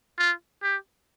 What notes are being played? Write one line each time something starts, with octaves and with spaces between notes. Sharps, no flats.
F4
G4